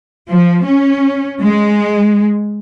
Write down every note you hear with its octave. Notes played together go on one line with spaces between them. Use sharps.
F3
C#4
G#3